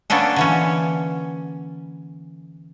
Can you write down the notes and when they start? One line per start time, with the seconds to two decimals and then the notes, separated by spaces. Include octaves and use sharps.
0.10 A#3 B3 C#4 D4 A4
0.36 D3 E3 C#4